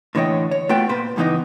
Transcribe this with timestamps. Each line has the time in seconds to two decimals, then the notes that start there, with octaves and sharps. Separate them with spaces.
0.15 A2 D3 E3 C#5 D#5 G5
0.51 C#5
0.69 A3 B3 F4 F#4 G5
0.89 A#2 B4 C5
1.16 C#2 G2 E3 B3 D#4 D#5